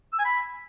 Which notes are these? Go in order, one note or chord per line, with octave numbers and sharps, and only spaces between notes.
E6
G#5
B5